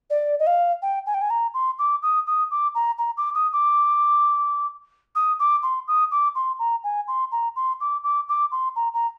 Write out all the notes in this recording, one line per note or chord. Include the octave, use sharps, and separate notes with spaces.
D5
D#5
F5
G5
G#5
G5
G#5
A#5
C6
D6
D#6
D#6
D6
A#5
A#5
D6
D#6
D6
D#6
D6
C6
D#6
D6
C6
A#5
G#5
C6
A#5
C6
D6
D6
D6
C6
A#5
A#5